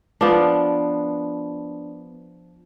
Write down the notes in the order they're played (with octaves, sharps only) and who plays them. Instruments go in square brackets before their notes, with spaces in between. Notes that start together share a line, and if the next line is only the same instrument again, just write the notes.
[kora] F3 B3 D4